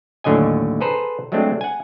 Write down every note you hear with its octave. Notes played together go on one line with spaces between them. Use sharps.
D#2 A2 D3 F#3 D#5 G#5
G#4 A4 B4 C5 A#5
F#3 G#3 A3 C4 D4
F#5 G#5